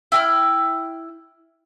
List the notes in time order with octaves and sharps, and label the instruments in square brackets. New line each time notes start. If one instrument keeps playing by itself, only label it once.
[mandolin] E4 G5 B5 F6